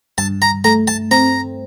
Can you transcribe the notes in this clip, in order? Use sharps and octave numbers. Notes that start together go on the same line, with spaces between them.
G2 A5
A#5
A3 A#5
A5
C4 A#5